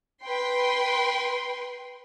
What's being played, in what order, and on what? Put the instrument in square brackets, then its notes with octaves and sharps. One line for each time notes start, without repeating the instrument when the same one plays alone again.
[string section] B4 G5 C6